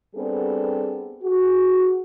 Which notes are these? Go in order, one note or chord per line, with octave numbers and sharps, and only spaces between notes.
G3 B3 C4 D4 G#4 A4
F#4 G#4